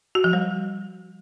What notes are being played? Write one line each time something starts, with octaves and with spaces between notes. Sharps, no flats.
F#4
F3
G3